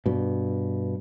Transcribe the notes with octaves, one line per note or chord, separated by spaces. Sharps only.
G2 B2